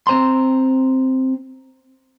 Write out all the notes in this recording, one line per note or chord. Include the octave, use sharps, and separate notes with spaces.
C4 C5 A#5 C6